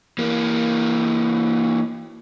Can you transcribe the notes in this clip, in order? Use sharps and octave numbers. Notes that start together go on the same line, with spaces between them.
E3 A#3